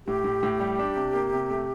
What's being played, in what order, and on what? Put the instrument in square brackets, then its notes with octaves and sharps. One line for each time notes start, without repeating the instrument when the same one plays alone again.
[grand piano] A2 [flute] G4
[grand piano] A2
A2
G3
D4
C3
A#3
C3
A3